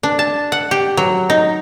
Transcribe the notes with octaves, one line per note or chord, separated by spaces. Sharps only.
D4
A5
F#5
G4
F#3
D#4